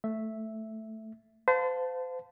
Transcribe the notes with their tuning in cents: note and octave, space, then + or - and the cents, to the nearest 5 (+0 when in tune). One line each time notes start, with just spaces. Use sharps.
A3 +0 E5 +0
C5 -35 F5 +20 A5 +0